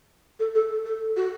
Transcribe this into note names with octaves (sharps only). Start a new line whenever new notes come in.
A4
A4
A4
F#4